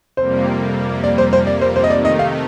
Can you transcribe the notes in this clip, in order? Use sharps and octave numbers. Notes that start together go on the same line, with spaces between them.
F2 C3 G3 A#3 C5
D5
C5
C5
D5
C5
C5
D#5
C3 D#3 A3 D#4 D5
D#5
F5